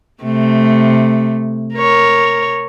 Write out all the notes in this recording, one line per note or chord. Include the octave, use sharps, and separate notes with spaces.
C3 A3
A#4 C#5